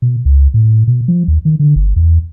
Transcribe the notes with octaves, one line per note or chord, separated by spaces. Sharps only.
B2
C#2
A2
B2
F3
D#2
D#3
D3
G1
E2